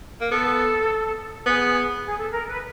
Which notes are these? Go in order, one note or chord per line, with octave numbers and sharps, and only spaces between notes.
A#3
B3 A4
B3 G#4
G#4
A4
A#4
B4